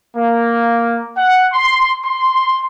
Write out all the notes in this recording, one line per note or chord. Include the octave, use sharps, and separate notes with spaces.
A#3
F#5
C6
C6